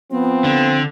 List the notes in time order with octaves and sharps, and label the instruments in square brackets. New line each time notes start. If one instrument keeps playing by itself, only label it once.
[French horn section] F3 C4 [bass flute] B3
[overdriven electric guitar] D3